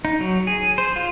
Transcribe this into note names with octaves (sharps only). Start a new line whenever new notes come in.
D#4
F#3
G#4
C5
F4